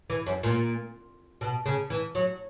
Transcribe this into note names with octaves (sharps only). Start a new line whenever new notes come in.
E3
F#2
A#2
B2
C#3
E3
F#3